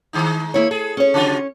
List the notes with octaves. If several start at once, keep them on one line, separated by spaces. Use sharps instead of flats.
D#3 G#3 D#4
A#3 E4 C#5
G#4 A4
C#4 C#5
C#3 F#3 F4